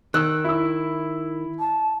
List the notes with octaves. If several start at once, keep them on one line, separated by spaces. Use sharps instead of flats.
D#3 E6 F#6
E4 E6
A5